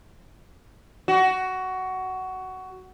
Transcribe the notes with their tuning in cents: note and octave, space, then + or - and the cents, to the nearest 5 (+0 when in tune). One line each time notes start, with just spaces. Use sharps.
F#4 +15